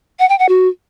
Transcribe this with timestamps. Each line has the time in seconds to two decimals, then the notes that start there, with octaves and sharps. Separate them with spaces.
0.19 F#5
0.29 G5
0.39 F#5
0.49 F#4